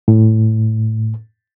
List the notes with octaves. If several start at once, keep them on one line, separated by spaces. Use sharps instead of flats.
A2